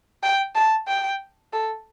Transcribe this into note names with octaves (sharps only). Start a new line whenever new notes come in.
G5
A5
G5
A4